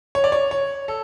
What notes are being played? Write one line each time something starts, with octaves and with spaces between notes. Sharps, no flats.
C#5
D5
C#5
C#5
A4